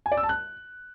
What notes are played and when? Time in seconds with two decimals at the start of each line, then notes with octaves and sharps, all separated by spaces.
0.06 G#5
0.12 D5
0.17 E6
0.23 A5
0.29 F#6